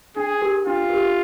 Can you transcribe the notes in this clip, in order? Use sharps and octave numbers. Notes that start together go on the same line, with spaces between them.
D4 G#4
G4 A#4
D4 F4
G4 A#4